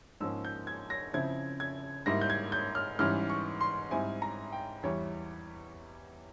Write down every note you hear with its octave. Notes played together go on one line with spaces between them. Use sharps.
G#2 F3 A#3 C#4 E6
G6
G#6
A#6
C#3 F3 C4 E4 G#6
G#6
G#2 G3 A#3 E4 A#6
G6
G#6
G6
F6
G#2 E3 G3 C#4 F6
C#6
C6
G#2 G3 C4 E4 G#5
A#5
G5
E2 E3 G3 C#5